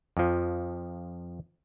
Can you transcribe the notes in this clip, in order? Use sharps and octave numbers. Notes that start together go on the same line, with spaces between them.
F2 F3